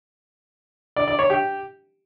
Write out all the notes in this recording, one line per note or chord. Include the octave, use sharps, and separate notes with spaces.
D5
D5
C#5
G4